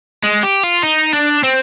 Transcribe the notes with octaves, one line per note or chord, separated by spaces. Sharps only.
G#3
G4
F4
D#4
D4
C4